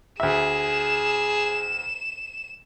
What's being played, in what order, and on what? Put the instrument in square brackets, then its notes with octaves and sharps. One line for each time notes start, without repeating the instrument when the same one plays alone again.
[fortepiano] D2 E5 [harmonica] G#4 [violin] E7